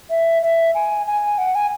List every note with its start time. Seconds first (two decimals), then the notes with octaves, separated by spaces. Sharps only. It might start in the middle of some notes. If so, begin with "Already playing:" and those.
0.10 E5
0.42 E5
0.75 G#5
1.07 G#5
1.38 F#5
1.55 G#5